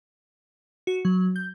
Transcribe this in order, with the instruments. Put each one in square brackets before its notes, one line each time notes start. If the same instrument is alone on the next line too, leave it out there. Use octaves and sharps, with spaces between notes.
[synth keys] F#4
F#3
G6